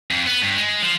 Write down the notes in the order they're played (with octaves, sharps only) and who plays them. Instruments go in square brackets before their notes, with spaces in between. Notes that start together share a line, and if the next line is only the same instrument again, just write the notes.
[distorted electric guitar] F2
B3
G2
G#3
F3